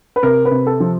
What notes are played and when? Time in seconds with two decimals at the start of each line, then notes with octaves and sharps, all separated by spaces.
0.16 B4
0.23 C3 A#4
0.45 B4
0.51 C3
0.67 A4
0.80 F3